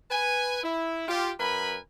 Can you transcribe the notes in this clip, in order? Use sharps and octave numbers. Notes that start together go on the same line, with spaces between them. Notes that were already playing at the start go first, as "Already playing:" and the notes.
B4 G#5
E4
F4 G4
F#2 A#4 B4 G#5 B5